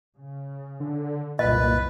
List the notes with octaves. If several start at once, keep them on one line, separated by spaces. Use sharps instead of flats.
C#3
D3
F#1 C2 A#2 B4 D#5